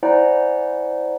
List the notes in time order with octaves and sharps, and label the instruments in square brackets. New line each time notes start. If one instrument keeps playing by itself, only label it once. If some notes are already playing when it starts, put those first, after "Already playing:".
[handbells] E4 C5 D5 F#5 G#5 A#5